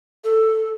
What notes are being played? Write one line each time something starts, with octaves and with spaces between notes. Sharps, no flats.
A4